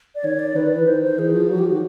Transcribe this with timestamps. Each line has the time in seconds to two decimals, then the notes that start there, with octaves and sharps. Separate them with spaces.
0.15 D5
0.24 D#3 C#5
0.39 D5
0.55 D#3 B4
0.71 E3 B4
0.86 D#3 C5
1.02 C5
1.18 E3 G#4
1.34 F3
1.50 F#3 F#4
1.59 F3 G4
1.68 D#3 F#4